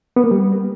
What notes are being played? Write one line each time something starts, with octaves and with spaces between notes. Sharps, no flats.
B3
A#3
G3